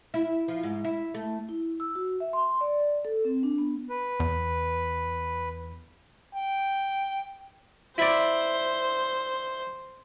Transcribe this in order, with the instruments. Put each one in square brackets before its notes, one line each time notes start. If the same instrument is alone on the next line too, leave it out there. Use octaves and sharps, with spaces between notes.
[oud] E4
F3
G#2
E4
A3
[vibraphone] E4
E6
F#4
E5
C6
D5
D5
A4
C4
D4
B3
[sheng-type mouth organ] B4
[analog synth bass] E2
[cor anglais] G5
[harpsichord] E4 D5 [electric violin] C5